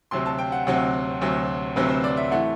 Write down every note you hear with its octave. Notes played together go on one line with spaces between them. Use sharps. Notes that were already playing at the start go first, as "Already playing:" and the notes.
D2 C3 F#3 C4 C6
A5
G5
F#5
D2 C3 F#3 C4 F#5
D2 C3 F#3 C4
D2 C3 F#3 C4 B4
C5
D5
E5
E3 A3 F#5